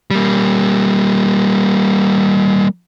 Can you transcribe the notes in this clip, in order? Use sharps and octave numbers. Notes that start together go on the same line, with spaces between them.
G3 A#3